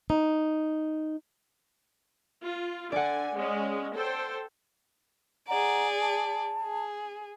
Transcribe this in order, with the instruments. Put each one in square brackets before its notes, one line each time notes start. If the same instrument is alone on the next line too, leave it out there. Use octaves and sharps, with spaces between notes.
[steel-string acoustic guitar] D#4
[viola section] F4
[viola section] D3 G#5 [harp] D5 F#5
[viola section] G#3 C#4
A4 C5 G5
[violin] G#4 D5 [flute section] F#5 A#5
[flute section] A5
[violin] G#4